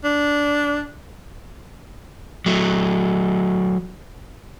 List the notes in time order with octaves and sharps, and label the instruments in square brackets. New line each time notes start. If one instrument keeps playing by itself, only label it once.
[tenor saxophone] D4
[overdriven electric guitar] F#3 A3